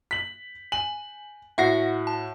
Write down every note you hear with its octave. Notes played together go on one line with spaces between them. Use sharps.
B6 F#7
G#5 F#7
A2 F#4 E5 F#5 A#6 C7
A5